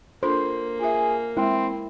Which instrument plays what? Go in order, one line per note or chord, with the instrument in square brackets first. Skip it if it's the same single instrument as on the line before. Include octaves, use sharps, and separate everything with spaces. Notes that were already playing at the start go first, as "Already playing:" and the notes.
[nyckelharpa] A#3 [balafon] D4 F4 A4 [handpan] C5
[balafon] F4 E5 [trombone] G#4
[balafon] G#3 [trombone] C4 [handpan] E4